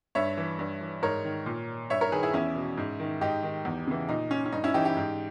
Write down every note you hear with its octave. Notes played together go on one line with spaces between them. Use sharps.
G2 C#5 E5
E3
G2
E3
G#2 A#4 C#5
D#3
A#2
G2 C#5 E5
A#4 C#5
D#3 G#4 B4
E4 G#4
E2 C#4 E4
B2
G#2
D#3
G#2 D#4 G4
D#3
E2
C#3 E3
A#2 D#4
C#4
C#4
G2 D#4
C#4 E4
E3 D#4 G4
D#4 G4
G#2